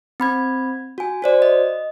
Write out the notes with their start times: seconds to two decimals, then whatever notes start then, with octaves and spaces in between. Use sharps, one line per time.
0.20 C4 B5 G#6
0.98 F#4 G#5
1.22 F#4 C5 D5
1.42 D#5